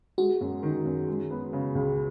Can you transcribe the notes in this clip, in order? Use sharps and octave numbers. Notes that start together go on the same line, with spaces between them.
G#3 F#4
F#2
D#3
F#2
G#3
B3
C#3
C#2